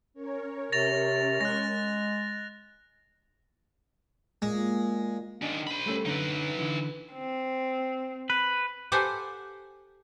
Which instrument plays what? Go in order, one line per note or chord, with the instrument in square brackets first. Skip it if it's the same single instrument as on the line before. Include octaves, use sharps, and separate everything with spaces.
[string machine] C#4 A#4 C#5
[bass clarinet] C3 [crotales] A6 A#6 F7
[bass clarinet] G#3 [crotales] F#6 A#6
[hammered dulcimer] A#2 A#3 [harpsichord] G#3
[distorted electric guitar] D#3 C#4 [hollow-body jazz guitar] D4
[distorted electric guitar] C5 B5
[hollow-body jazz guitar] G3 A3 C#4
[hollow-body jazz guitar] F#2 D3 [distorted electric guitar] D#4 B4
[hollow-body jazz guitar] D3 E3
[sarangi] C4
[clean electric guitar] B4
[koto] G4 A4 B4 C5 F#5 G#5